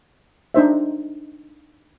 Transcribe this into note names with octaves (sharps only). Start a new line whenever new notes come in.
D4 D#4 C5 E5